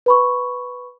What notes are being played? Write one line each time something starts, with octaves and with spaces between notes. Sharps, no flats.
B4 B5 C#6